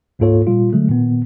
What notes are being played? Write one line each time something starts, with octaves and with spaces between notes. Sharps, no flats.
D2 G#2 A#3 F4 A4 C#5
A#2 G3 F4
D3 F#3 G#3 A3
A#2 D#3 B3